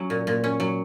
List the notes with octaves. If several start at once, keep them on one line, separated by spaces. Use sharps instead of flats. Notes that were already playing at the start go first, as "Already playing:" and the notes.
Already playing: F#3 C#4
A#2
A#2
C#4
F#3